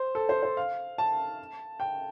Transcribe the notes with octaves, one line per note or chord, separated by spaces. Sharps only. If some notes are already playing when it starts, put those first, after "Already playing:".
Already playing: C5
A4
C5
C5
F5
A5
G5